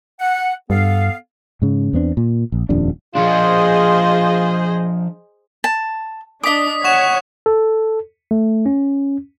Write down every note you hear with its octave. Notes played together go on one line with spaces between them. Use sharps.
F#5
G2 B3 A4 F5
G#2 C#3
E2 B3 C4 D4
A#2
A#1
D#1 F2 G3 D4
F3 D4 F4 G#4 C5 D#5
A5
D4 D#5 D6 D#6 B6
C#5 F#5 C#6 E7
A4
A3
C#4